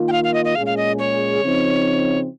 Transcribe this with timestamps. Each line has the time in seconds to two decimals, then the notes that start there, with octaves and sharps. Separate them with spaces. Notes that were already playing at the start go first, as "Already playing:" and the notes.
Already playing: D#3 A#3 F4
0.08 G5
0.12 F5
0.24 F5
0.34 D#5
0.45 D#5
0.55 A#2 G#3 C#4 G#4 F5
0.66 F5
0.77 D#5
0.99 C#5
1.41 C#3 F3 C4 D#4